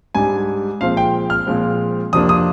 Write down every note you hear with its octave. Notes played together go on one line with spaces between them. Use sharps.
G#2 G3 D4 G#5
A#2 F3 G#3 C4 F5
G5
F6
A#2 F3 G#3 C4
F2 C3 F3 A#3 D4 D#6
D#6